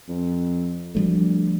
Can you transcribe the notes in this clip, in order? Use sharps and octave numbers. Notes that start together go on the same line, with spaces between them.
F2
D2 F3 G3 A3